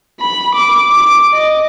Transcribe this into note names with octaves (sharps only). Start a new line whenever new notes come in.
B5
D6
D6
D#5